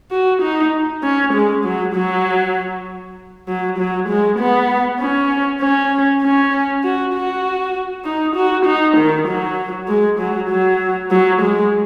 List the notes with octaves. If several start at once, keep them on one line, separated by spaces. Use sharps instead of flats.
F#4
D#4
C#4
G#3
F#3
F#3
F#3
F#3
G#3
B3
C#4
C#4
C#4
F#4
F#4
D#4
F#4
D#4
D#3
F#3
G#3
F#3
F#3
F#3
G#3